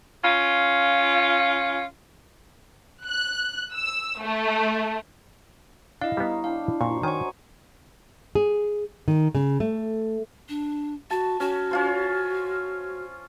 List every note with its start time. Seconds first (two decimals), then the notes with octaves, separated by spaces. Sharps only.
0.24 C#4 F4
3.06 F#6
3.75 E6
4.21 A3
6.01 D4 E4 D#5 F5
6.17 G3 B3 D#4 C#5 A#5
6.44 D4 F5 G5
6.81 F#2 A#2 C5 A#5 C#6
7.03 D#3 D#4 F#4 C#5 G#5 C#6
8.35 G#4
9.08 D#3
9.35 C#3
9.60 A3
10.49 D4
11.11 F#4 A5
11.40 C#4 F#4
11.71 C#4 F4 C5